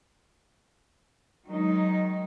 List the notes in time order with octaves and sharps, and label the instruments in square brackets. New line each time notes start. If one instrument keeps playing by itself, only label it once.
[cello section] D#3 F#3 G#3 D#4